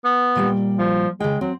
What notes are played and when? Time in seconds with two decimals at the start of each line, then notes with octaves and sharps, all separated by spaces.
0.05 B3
0.35 A#2 G3 G5
0.78 F3
1.20 C#3 G#3 G5
1.41 F#3 C4